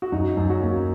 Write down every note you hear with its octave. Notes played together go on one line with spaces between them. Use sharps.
F#4
F#2 D#4
F#2
C#4 F#4
A#3